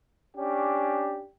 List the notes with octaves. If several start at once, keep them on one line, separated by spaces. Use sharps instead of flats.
C#4 D4 G4